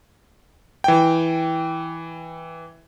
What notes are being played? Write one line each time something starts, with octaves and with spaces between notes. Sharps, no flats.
E3 G5